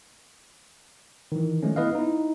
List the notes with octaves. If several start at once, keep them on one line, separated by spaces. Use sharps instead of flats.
D#3 E3
F3 G#3 A3 C#4
B3 E4 B4 D#5 F5
D#4 E4